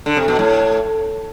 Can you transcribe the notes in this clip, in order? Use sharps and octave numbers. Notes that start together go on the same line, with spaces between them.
D3
C3
B2
A2